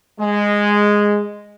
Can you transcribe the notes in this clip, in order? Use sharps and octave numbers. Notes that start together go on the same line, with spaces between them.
G#3